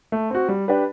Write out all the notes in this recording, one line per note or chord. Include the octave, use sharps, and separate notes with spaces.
A3
C4 F#4
G3
D4 G4 B4